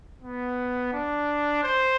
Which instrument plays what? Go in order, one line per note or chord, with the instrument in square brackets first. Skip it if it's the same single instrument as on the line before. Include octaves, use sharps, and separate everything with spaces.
[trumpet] B3
D4
C5